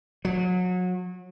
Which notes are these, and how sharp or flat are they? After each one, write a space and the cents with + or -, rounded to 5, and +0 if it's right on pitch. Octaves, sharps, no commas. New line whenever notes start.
F#3 -30